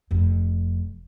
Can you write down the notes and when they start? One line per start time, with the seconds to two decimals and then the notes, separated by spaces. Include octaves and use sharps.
0.11 F1 F2